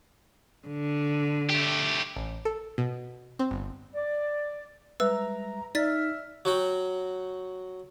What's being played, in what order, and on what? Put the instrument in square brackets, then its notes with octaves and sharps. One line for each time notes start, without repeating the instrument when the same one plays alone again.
[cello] D3
[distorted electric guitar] A3 G4
[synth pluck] A1
A4
B2
C4
G1
[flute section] D5
[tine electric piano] G3 G#3 E5 [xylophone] B4 E6 [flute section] A#5
[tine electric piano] D#4 [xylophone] D5 A6 B6 [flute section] E5 F6
[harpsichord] F#3 F#4 G5